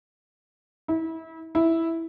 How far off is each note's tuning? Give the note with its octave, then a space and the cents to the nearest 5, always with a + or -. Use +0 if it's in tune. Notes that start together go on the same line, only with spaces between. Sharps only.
E4 -30
E4 -5